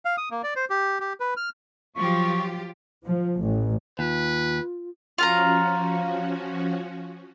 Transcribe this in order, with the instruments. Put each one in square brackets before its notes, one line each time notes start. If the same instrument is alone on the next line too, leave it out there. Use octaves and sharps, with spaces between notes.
[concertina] F5
D#6
A#3
D5
C5
G4
G4
B4
F6
[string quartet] F3 [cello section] F#3 F4 G4 [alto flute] C#6
[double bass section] F3
A1
[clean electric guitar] D#2 [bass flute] F4 [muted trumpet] B4
[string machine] F3 C#4 F#4 [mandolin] F4 F5 A#5